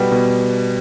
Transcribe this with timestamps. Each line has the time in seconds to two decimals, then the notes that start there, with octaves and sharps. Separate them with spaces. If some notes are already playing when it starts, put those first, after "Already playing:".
Already playing: B2 G3 B3
0.12 B2